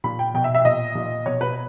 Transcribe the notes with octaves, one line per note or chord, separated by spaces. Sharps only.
A#2 B5
G5
B2 G5
E5
E5
A#2 D#5
A#2
B2 C#5
B4